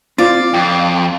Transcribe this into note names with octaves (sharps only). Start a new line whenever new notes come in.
C4 F4 C5 D5 F5
F2 G5